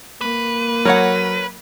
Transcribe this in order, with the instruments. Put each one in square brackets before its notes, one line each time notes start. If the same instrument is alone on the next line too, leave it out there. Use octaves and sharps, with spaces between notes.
[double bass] A#3 [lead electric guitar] B4
[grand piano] F#3 [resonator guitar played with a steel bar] A#4 C#5 F#5